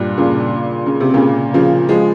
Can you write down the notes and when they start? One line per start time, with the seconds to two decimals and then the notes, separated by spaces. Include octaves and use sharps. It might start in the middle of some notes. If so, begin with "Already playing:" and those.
Already playing: G2 A#2
0.18 A#2 C#3
0.86 C#3
1.00 C3
1.14 A#2 C#3
1.54 C#3 F3
1.89 F3 G#3